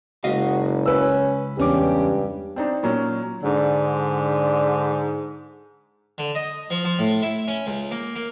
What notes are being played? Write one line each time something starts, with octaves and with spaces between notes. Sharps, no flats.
F#1 C#2 F#4 D#5 F5
C#4 B4 E6
E2 G2 C#4 G4 D6
C4 D4 D#4
A#2 F#3 C#4
G#2 D3
D3
D#5
F3
F3
A2
E4
C#4
C#2
A#3
A#3